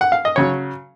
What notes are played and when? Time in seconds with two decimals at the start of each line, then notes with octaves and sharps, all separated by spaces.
0.01 F#5
0.12 F5
0.25 D#5
0.36 C#3 F#3 C#5